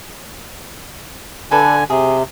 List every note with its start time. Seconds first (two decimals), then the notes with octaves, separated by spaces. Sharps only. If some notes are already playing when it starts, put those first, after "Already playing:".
1.51 D3 A4 B4 D5 G#5
1.90 C3 G#4